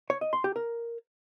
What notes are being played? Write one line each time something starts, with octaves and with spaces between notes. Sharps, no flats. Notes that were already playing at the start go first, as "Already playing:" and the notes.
C#5
D#5
C6
G4
A#4